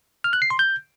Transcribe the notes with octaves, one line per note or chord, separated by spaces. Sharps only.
F6
F#6
C7
C6
G6